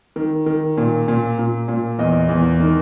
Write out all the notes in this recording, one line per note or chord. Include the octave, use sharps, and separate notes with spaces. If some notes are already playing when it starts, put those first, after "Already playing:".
D#3
D#3
A#2
A#2
A#2
A#2
E2 D#5
E2
D#3